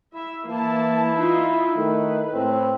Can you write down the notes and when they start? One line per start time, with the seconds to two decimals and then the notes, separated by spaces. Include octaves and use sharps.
0.14 E4 E5
0.47 E3 A#3 E4 A5
1.17 D#4 F4 E5
1.77 D#3 A3 B4
2.34 A2 C4